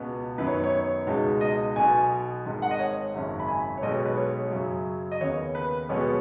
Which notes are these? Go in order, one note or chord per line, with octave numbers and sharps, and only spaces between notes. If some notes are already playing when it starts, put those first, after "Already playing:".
Already playing: C#2 B2 B3
F#2 D#3 B3 D#4 B4
C#5
C#5
C#2 B2 G#3 D#4
D#5
B1 B2 B3 G#5
G#1 G#2 D#3
F#5
D#5
C#5
G#1 F#2 C#3
B5
G#5
C#5
B1 B2 G#3 D#5
C#5
B4
C#5
F#2 C#3 F#3
D#5
D#2 C#3 B3 C#5
B4
B1 B2 G#3 B3 C#5